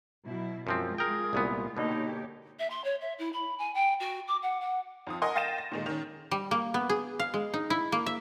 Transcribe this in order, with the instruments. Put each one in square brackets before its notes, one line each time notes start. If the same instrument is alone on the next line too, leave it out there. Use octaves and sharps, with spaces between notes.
[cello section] B2 F#3 E4
[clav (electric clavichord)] F#2 F3 C4 [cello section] G#3 F4
[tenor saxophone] G#4 [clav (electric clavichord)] A#4 G5
[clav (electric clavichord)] C2 A#2 B3
[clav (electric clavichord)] B2 D3 [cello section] A#3 G4 C#5 [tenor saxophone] D#4
[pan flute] E5
C6
C#5
E5
E4
B5
G#5
G5
F#4
D6
F#5
F#5
[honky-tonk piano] F2 F3 D#6
A#4 D#5 F#5 G#5 C6
F5 G5 A6 A#6 D#7 E7
A#6
A#2 D#3 G#3
D#3 C#4
[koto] G3
A#3
B3
G#4
F5
G#3
D#4
E4
A#3
E5